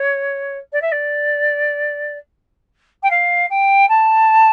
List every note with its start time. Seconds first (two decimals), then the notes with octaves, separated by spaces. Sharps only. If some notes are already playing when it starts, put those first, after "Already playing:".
Already playing: C#5
0.73 D5
0.82 E5
0.92 D5
3.03 G5
3.11 F5
3.50 G5
3.89 A5